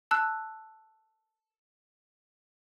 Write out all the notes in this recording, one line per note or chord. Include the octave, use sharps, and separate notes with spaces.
A5 E6 F#6